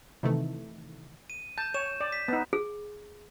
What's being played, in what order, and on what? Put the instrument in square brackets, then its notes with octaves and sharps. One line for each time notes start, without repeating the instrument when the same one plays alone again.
[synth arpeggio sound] C3 D#3 E3 A3
[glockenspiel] D#7
[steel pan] A5 [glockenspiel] G6
[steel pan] C#5 [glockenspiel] E7
[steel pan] D5
[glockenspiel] B6
[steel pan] B3 D#4
[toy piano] G#4